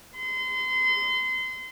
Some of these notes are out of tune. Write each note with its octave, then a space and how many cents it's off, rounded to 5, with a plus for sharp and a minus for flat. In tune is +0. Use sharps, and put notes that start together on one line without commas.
C6 -30